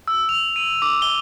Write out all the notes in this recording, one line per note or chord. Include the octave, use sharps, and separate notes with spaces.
E6
F7
D#7
D6
G7